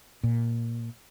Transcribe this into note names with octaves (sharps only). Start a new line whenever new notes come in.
A#2